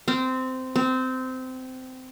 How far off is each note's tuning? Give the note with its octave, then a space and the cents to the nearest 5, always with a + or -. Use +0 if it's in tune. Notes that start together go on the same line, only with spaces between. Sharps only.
C4 -15
C4 -20